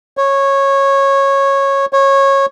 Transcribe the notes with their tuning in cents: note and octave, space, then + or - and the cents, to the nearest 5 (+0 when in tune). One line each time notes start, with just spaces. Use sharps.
C#5 -15
C#5 -20